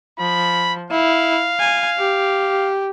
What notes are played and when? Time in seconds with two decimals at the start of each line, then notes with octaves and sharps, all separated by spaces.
0.19 F3 B5
0.91 E4 F5
1.59 G#5
1.98 G4